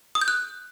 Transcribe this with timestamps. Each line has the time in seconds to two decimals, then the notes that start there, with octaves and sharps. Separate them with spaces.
0.15 D#6
0.21 G6
0.28 F#6